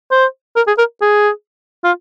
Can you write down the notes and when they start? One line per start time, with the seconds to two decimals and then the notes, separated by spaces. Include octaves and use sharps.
0.11 C5
0.56 A#4
0.67 G#4
0.78 A#4
1.02 G#4
1.84 F4